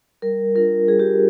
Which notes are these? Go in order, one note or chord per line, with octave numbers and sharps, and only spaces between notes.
G3 A#4
D4 F4 A#4
G3 G#4
G4